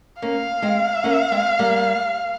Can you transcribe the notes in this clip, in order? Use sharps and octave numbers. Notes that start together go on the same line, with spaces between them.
A#3 C#4 F5
G#3 C4
A#3 C#4
G#3 C4
G3 A#3